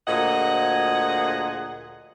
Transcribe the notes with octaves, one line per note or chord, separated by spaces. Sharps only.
D2 A#2 F3 G#4 D#5 F#5